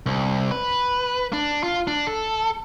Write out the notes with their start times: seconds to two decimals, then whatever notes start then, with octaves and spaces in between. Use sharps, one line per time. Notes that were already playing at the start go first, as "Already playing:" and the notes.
0.06 C2
0.51 B4
1.33 D4
1.63 F4
1.87 D4
2.07 A4